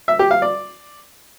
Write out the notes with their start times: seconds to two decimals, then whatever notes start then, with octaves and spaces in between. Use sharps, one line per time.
0.08 E5
0.19 G4
0.31 F5
0.42 D5